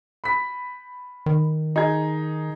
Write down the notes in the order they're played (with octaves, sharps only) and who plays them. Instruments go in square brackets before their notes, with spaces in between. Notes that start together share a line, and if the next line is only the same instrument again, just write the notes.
[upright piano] B5 B6
[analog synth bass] D#3
[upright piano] D#4 G#4 G#6